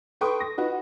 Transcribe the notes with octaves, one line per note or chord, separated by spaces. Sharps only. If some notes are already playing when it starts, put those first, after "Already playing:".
A4 B4 G5 C6 C#6 D#6
A#6
D#4 F4 F#4 B4